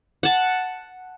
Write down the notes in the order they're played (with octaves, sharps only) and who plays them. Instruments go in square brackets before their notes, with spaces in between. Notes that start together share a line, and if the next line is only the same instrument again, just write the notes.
[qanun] F#5 A5